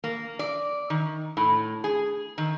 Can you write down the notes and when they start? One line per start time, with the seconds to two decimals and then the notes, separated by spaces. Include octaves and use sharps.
0.04 A#3
0.39 D5
0.90 D#3
1.37 A2
1.84 G#4
2.38 D#3